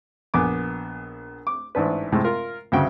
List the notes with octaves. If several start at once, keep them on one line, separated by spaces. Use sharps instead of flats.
A#1 B3 G#5 D6
D6
A1 G#2 D4 B4
A2 C3 G#3
F4 A#4
D2 G2 C#3 F#4 E5 G5